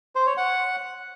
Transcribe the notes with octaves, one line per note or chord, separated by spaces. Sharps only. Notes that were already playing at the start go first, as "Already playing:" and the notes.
C5
C#5
F#5